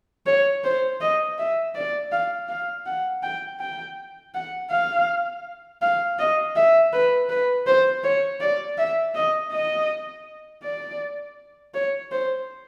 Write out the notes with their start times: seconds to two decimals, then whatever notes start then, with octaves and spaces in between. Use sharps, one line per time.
0.26 C#5
0.64 C5
1.01 D#5
1.38 E5
1.75 D5
2.12 F5
2.49 F5
2.86 F#5
3.23 G5
3.60 G5
4.34 F#5
4.71 F5
5.82 F5
6.19 D#5
6.56 E5
6.93 B4
7.30 B4
7.67 C5
8.04 C#5
8.41 D5
8.78 E5
9.15 D#5
9.52 D#5
10.63 D5
11.74 C#5
12.11 C5